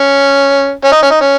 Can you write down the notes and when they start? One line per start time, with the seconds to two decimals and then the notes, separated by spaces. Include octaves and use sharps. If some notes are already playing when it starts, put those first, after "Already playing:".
Already playing: C#4
0.84 C#4
0.92 D#4
1.02 C#4
1.11 D#4
1.21 C#4